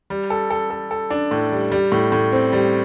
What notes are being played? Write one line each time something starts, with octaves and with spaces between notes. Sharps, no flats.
G3
A4
A4
A4
A4
D4
A2
G3
G3
A2
A2
C4
G3